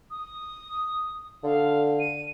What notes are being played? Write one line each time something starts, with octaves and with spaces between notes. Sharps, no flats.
D#6
D3 F5
D#7